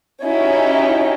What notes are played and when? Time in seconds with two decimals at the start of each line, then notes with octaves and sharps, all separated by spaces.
0.23 C#4 D#4 E4 F#4 G4